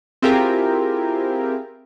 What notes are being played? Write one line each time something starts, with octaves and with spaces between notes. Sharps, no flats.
C4 E4 F4 G4 G#4 A#4